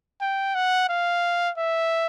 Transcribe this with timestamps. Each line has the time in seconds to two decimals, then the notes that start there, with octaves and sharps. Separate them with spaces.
0.21 G5
0.55 F#5
0.89 F5
1.57 E5